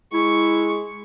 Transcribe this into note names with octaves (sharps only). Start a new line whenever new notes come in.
G#3 E4 C#6